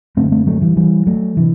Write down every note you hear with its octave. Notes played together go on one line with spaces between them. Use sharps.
F#2 D3 A3 C4
A3 C4
F#3 A3
E3 G3
E3 G3
F#3 A3
C3 E3